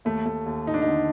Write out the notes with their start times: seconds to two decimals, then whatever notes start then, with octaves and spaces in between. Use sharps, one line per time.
0.05 D#2 A3
0.26 A3
0.46 D#2
0.67 D#4
0.74 D4
0.82 D#4
0.87 D3